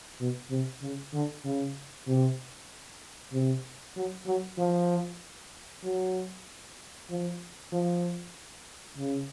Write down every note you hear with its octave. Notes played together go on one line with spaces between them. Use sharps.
B2
C3
C#3
D3
C#3
C3
C3
F#3
F#3
F3
F#3
F3
F3
C#3